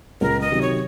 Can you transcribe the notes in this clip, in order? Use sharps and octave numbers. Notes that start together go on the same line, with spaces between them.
C#2 A#4
D#5
C3 D#3 F#3
C#5